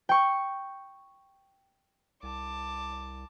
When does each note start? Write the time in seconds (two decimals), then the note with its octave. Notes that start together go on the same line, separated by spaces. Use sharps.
0.09 G5 C#6
2.23 C2 A5 D6